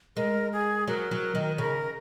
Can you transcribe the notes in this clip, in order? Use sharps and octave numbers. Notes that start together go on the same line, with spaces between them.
G#3 A#4
G#4
F#3 A#4
F#3
D#3
C#3 A#4